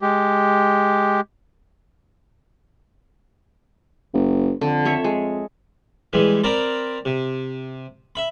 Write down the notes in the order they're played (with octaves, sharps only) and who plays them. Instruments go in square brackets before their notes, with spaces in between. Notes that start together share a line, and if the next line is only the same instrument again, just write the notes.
[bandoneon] G#3 G4
[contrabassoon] F#1
[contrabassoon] F2 [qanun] D3
[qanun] A4 C#5 E5
G#3
[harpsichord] E3 G3 G#3
C4 A#4 D5 A#5 B5
C3
E5 B5